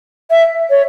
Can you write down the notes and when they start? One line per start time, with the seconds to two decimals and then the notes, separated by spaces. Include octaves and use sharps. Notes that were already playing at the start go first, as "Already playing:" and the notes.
0.30 E5
0.70 C#5